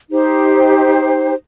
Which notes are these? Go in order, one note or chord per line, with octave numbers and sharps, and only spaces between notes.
D#4 G4 C5